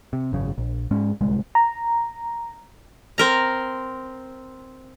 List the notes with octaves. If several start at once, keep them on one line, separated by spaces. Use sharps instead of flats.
C3
G#1 F#2 C#3
A#1
G#2 G#3 C#4
D1 C2 G#3
A#5
C4 A#4 A#5